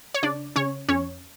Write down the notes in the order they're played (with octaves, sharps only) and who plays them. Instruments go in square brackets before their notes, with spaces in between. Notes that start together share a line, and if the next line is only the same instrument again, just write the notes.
[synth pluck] C#5
C#3 D4 D5
C#3 C#4 C#5
F2 C#4 C#5